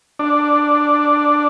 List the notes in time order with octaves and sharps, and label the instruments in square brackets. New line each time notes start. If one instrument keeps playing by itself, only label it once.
[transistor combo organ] D4